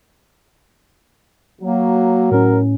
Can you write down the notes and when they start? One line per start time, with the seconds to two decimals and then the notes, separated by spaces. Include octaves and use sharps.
1.61 F#3 A#3
2.31 A2 C#4 A#4